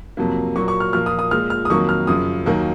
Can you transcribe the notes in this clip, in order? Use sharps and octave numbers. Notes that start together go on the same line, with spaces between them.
F2 C3 F#3 A#3
A#2 F#3 A#3 C#6
C#6
F6
A#2 F3 A#3 F6
D#6
D#6
A#2 F3 G#3 F6
F6
D#6
F2 D#3 F#3 A#3 C#6
F6
F#2 C#3 F3 D#6
D#2 D#3 F#3 A#3